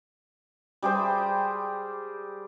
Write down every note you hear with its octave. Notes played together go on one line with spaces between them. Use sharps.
G3 G4 G#4 C5